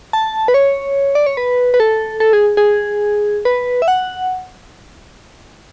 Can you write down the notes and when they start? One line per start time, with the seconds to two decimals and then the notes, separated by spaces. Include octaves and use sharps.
0.13 A5
0.48 B4
0.54 C#5
1.15 D5
1.26 C#5
1.37 B4
1.74 B4
1.80 A4
2.20 A4
2.33 G#4
2.57 G#4
3.45 B4
3.82 E5
3.88 F#5